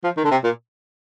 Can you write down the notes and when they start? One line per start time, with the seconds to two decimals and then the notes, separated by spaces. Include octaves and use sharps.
0.04 F3
0.17 D#3
0.24 D3
0.31 C3
0.44 A#2